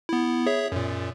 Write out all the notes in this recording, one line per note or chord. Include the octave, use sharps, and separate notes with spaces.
B3 E4
G#4 C#5 E5
F#2 A#2